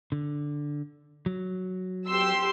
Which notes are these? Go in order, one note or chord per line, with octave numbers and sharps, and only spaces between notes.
D3
F#3
G4 C6 E6